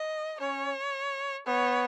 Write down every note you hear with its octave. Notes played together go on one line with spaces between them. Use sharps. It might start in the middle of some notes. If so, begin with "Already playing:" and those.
Already playing: D#5
C#4 C#5
B3 C#5